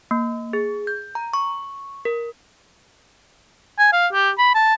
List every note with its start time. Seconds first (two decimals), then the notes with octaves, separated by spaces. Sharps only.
0.11 A#3
0.53 G#4
0.87 G6
1.15 A#5
1.33 C#6
2.05 A#4
3.79 G#5
3.93 F5
4.13 G4
4.38 B5
4.55 A5